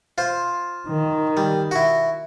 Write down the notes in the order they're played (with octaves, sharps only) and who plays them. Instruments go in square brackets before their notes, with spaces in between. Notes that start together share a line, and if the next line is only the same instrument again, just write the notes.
[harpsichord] F4 C5
[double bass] D#3
[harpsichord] G3
E4 F#4